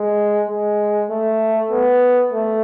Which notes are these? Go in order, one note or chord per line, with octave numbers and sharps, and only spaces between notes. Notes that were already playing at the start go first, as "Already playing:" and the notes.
Already playing: G#3
G#3
A3
B3
A3